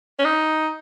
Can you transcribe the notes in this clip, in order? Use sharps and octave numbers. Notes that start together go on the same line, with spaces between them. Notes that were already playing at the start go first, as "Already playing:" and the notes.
C#4
D#4